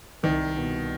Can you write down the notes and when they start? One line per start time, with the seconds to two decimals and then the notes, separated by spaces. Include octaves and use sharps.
0.23 C2 D#3
0.57 B2